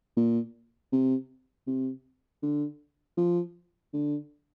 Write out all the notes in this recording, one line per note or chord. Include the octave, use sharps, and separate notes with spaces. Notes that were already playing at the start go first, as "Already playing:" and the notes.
A#2
C3
C3
D3
F3
D3